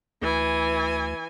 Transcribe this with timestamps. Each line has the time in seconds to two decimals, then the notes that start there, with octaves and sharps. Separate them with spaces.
0.22 D2 E3 G#5